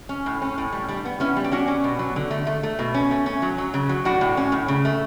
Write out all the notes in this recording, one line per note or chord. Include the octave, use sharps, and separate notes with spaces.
C#4
A2
C#4
A2
G3
G3 D4
B3
B3 C#4 E4
G3
G4
C#4 D4 F#4
C#4
B2
F#3
D3
A3
A3
A3
B2
C#4
A3
C#4
F#3
F#3
C#3
F#3
A2 D4 F#4
A2
C#4
A2
C#3
A3